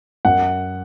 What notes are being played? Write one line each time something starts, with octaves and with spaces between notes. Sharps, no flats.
F#2 F#5